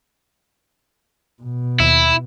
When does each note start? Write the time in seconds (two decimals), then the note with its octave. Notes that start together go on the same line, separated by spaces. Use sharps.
1.42 B2
1.80 D#2 E4